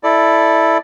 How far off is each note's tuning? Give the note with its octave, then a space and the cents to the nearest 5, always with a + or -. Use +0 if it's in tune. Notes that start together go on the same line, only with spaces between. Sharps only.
E4 +0 A4 +0 D5 +10